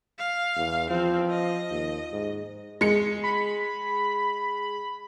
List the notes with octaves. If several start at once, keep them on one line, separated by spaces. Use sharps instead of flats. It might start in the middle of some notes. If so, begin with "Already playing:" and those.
F5
E2
F3 C4
D#5
D#2
G#2
G#3 C#7
B5